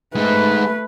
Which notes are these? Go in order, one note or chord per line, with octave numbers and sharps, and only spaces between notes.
G#3 A3 D#4 B4